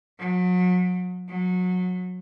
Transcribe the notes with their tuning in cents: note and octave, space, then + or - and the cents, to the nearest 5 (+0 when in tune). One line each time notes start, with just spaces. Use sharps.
F#3 -35
F#3 -25